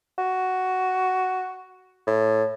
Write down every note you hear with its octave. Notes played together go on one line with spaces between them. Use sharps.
F#4
A2